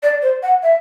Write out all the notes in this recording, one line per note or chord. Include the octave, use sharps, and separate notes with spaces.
D5
C5
F#5
E5